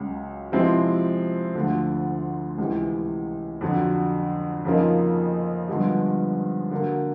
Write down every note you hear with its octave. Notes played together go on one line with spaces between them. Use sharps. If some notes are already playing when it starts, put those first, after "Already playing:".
Already playing: C#2 C#3 F#3
C3 F3 G#3 C4 E4
D2 D3 F3
C#2 C3 E3
F2 D3 F#3
F2 C#3 F3 A#3 D#4
G2 D3 F3 G#3 B3
D3 F#3 A#3